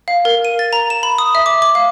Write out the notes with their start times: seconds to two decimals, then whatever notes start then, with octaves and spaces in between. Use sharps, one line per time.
0.08 F5
0.25 A#4
0.45 D#7
0.59 A6
0.73 A#5
0.90 E7
1.03 B5
1.18 D#6
1.35 E5
1.46 D6
1.62 D6
1.75 F5